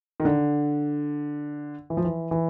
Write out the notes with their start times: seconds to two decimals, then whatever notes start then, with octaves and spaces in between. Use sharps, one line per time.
0.20 D#3
0.25 D3
1.90 E3
1.97 F3
2.04 E3
2.31 E3